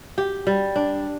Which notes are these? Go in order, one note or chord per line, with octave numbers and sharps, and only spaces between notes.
G4
G3
D4